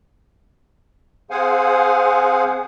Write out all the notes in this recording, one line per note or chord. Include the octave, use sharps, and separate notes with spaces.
C4 G#4 C5 F5 F#5 G#5